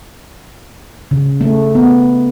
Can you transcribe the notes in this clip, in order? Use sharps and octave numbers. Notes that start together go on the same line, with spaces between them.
C#3
A3
B3